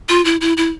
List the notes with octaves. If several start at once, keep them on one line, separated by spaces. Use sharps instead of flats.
F4
E4
E4
E4